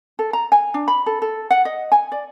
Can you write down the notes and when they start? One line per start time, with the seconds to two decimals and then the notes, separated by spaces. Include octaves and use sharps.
0.19 A4
0.33 A#5
0.52 G#5
0.74 D4
0.88 B5
1.06 A4
1.22 A4
1.51 F#5
1.65 D#5
1.92 G#5
2.12 D5